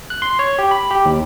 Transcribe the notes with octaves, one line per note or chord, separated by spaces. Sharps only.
F#6
C6
C#5
G4
B5
G4
D#2